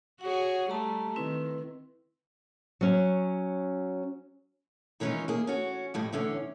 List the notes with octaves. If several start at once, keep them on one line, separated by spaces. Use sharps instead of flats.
F#4 G#4 C#5 F#5
G3 A3 A5 A#5
D#3 C4 E4 B4
F#3 C#4
D#3 E3 G#3 C#4 D#4 F4
A#3 G#4
C#4 F#4
F2 A2 G3 D#5
E2 A2 D3 C#4